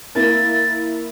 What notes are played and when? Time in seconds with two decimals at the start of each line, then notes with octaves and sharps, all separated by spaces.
0.15 A#3 E4 A#4 A6